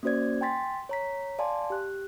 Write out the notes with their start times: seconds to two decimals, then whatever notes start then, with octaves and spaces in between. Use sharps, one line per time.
0.03 A#3 C#4 F#4 C5 D5 G#6
0.41 G5 G#5 C6 A6 B6
0.89 C#5 A#5 B6
1.39 D5 F5 G#5 A5 C6
1.70 G4 F#6